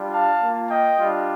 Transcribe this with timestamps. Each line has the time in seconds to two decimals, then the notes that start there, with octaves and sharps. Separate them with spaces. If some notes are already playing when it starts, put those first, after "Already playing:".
Already playing: G3 D4 F4
0.13 F5 A5
0.42 A#3 F4
0.70 D#5 G5
0.99 G3 D4 F4